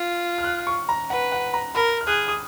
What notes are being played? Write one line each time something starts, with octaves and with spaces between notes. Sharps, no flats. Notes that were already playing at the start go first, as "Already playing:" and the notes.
Already playing: F4
F6
F#6
C#6
A#5
B4 F#5
F#5
A#5
A#4 B5
F6
G#4 F#6
D#6